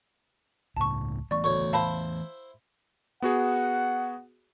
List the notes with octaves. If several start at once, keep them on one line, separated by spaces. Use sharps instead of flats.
C#2 A2 C#3 A5 C#6
E3 A3 B3 D5 C#6
D2 C#5 C#6
E4 C5 F5 A5 B5
B3 F#4 G#4 F#5